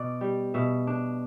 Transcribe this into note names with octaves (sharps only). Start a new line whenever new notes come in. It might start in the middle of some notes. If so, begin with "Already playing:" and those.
Already playing: B2 D5
G3
B2 E5
D4